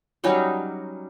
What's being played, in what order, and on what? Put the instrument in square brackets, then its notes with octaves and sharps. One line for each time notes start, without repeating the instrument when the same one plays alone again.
[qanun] F#3 G3 C#4 D#4